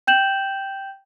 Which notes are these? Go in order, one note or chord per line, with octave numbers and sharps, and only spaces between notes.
G5 G6 E7 F#7